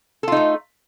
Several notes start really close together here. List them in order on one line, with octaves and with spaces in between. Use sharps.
A4 F4 D#4 A3